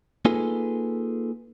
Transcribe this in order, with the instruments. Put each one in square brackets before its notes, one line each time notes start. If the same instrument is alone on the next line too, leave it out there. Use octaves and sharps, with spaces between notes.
[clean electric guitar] A#3 D#4 F4 G#4 A4 B4